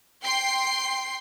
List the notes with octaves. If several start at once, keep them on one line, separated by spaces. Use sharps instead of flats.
G5 C6 C7